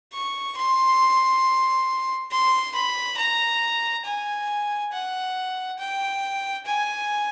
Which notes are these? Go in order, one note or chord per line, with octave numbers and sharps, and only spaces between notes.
C#6
C6
C6
B5
A#5
G#5
F#5
G5
G#5